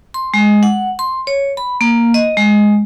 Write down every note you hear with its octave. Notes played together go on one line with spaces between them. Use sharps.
C6
G#3
F#5
C6
C#5
B5
A#3
D#5
G#3